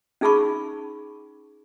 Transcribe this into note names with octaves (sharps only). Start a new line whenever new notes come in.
C#4 D#4 G#4 A5 B5 C#6